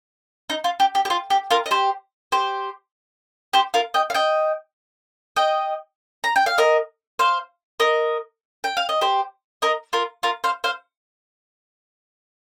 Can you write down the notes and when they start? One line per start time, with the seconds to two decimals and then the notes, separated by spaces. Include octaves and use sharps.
0.50 D#4
0.64 F4
0.80 G4
0.95 G4
1.05 G4
1.10 F4
1.30 G4
1.51 F4 A#4
1.66 D#5
1.71 G4 C5
2.32 G4 C5
3.53 G4 C5
3.74 F4 A#4
3.94 D#5 G5
4.10 F5
4.14 D#5 G5
5.36 D#5 G5
6.24 A#5
6.36 G5
6.46 F5
6.58 A#4 D#5
7.19 C5 F5
7.80 A#4 D#5
8.64 G5
8.77 F5
8.89 D#5
9.01 G4 C5
9.62 A#4 D#5
9.93 F4 A#4
10.23 F4 A#4
10.44 C5 F5
10.64 C5 F5